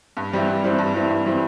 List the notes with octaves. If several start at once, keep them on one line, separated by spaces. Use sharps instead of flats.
G2
E3 G3 C4 E4
G2
E3 G3 C4 E4
G2
E3 G3 C4 E4
G2
E3 G3 C4 E4